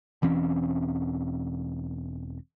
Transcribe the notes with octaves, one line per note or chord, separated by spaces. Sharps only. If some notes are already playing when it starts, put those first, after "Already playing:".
E1 E3 C4 C#4